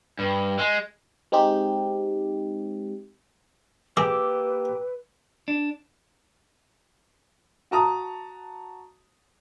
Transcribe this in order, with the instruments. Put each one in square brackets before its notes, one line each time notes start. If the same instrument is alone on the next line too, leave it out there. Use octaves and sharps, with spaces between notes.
[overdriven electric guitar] G2
G#3
[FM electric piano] G#3 C4 D#4 G4
[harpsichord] G#3 [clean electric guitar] A#3 G4 [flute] B4 [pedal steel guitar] D6 E6
[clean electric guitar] D4
[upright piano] F#4 A5 A#5 D#6